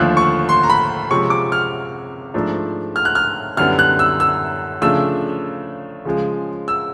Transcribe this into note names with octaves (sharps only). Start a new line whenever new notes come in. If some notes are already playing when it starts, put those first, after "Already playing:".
Already playing: D#2 D3 F3 A3 F#6
C#6
C6
A#5
B5
C3 F3 G#3 C#4 C#6
D6
F6
G#2 F3 A3 D4
F6
F#6
F6
F#2 D3 G3 B3 E4 F6
F#6
E6
E6
C#3 F3 A3 D4 E6
C#3 F3 G#3
E6